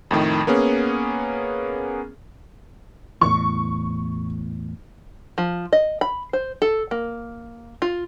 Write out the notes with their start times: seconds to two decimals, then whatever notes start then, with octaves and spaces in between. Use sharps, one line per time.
0.11 F2 A2 D#3
0.47 A#3 B3 C#4 G#4
3.21 E2 A2 C#6
5.38 F3
5.73 D#5
6.01 B5
6.33 C5
6.62 A4
6.91 A#3
7.82 F4